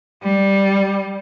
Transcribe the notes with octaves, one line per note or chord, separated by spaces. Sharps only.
G3